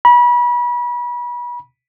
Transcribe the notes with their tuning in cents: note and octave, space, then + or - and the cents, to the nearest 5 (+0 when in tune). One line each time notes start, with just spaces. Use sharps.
B5 -35